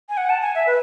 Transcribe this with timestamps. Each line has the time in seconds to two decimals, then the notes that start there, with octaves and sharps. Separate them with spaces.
0.09 G#5
0.17 F#5
0.29 A5
0.42 G#5
0.55 E5
0.67 B4